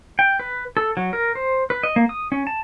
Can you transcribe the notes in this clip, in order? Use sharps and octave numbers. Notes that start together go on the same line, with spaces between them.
G5
B4
A4
F#3
A#4
C5
B4
D#5
A#3
D#6
C#4
A5